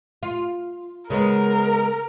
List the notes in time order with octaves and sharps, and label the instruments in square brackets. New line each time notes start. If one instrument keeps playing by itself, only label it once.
[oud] F4
[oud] C#3 G#3 B3 [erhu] A#4